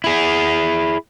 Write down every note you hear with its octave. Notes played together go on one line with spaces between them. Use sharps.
E4 G#4